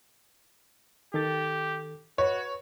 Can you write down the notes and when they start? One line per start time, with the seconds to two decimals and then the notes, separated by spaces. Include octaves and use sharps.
1.14 D#3 G4 A4 A6
2.18 F#4 B4 C#5